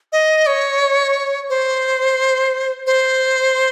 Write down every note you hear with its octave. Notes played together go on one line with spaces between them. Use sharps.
D#5
C#5
C5
C5